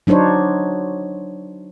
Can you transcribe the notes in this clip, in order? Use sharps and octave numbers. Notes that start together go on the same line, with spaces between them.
F#3 D4 D#4 C5 C#5